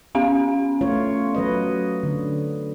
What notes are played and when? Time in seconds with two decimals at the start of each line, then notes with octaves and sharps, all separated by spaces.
0.15 B3 C#4 F5
0.81 A3 F4 C#5
1.35 F#3 B4 D#5
2.03 D3